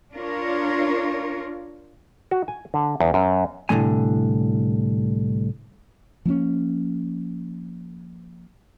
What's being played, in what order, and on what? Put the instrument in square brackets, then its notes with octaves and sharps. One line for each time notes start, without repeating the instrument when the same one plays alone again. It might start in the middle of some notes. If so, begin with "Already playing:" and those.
[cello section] D4 F4 A#4 C#5
[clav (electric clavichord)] F#4
G#5
D3
E2
F#2
[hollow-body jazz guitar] C2 A2 D3 G#3 G#5
[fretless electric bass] F3 A#3 C4 C#4